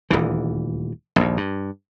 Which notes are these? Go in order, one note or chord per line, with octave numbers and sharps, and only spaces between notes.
D#1 D2 E3
A#1 D#2
G2